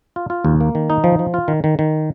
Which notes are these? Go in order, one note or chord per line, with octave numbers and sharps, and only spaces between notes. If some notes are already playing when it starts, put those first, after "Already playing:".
F4
F4
D#2
A#3
D#3
D#4
F3
F3
F4
D#3
D#3
D#3